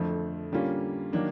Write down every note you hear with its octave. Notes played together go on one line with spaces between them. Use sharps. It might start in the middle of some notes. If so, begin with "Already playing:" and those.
Already playing: F2 D3 F3 A3
D3 G3 A#3 C#4 F4
D#3 F#3 A#3 D4